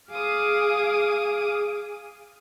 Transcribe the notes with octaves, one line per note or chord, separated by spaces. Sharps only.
G#4 F5 D6 D#6